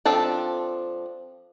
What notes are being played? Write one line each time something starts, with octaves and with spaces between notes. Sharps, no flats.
F3 C4 D4 A4